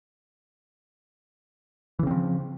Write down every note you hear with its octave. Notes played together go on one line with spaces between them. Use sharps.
C#3 E3 F3 C4